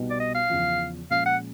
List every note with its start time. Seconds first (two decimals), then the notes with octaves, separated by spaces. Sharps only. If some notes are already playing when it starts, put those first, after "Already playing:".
Already playing: C2 B2 G3 B3 D#4
0.10 D5
0.20 D#5
0.35 F5
0.50 E2 C#3 F3
1.10 A#2 F3 G#3 C#4 F5
1.26 F#5